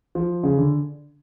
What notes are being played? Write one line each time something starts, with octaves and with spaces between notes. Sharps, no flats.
F3
C#3
D3